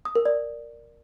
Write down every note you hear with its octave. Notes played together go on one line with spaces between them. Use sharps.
D#6
A#4
D5